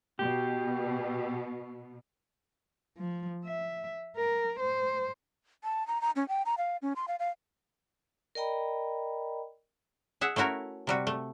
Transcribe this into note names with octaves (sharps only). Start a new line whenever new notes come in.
B2 G4
F3
E5
A#4
C5
A5
A#5
A#5
C#4
G5
A#5
F5
C#4
C6
F5
F5
A#4 D5 D#5 G5 A#5 B5
G#4 E5 F#5
A3 C#4 E4 F#4 A#4
C3 G3 F#4
A3